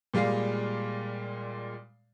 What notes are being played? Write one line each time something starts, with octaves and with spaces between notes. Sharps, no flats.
A#2 G3 G#3 F5 C7